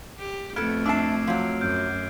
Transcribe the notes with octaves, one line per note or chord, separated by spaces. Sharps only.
G4
F2 A3 B3 A4 F6 G#6 D7
D4 E5 A5 D6 E6 C7
F3 F#3
F#2 F6 G6 D7